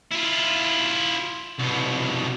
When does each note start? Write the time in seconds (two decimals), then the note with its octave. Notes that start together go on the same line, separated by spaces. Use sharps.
0.11 E4 F4
1.59 C2 B2